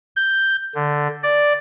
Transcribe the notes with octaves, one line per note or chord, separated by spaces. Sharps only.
G6
D3
D5